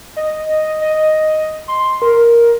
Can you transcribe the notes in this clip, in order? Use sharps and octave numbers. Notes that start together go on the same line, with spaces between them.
D#5
D#5
C6
A#4